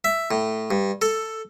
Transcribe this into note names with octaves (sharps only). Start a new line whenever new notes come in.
E5
A2
G2
A4